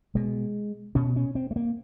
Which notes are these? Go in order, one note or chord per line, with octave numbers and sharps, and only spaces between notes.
B2 G#3
B2 C#4
C#4
C4
A3
A#3